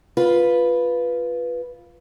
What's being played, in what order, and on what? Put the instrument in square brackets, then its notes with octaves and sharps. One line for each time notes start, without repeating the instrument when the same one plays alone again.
[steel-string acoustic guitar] F4 B4